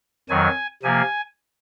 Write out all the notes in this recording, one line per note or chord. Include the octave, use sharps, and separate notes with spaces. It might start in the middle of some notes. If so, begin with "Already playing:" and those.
F2 D#3 F#3 G#5
C3 F3 A#3 G#5